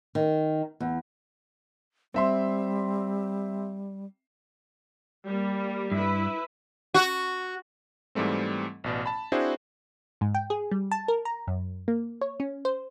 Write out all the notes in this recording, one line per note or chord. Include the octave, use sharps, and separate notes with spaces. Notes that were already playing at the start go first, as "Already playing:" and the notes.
D#3
E2
G3 C4 E5 C6
G3 A#3
G2 E4 B4
F#4
G#2 E3 G3 A3 C4
A1 B2 D5
A5 B5
C4 D4 E4 F#4 G#4 C5
G#2
G5
G#4
G3
A5
A#4
A#5
F#2
A#3
C#5
C#4
C5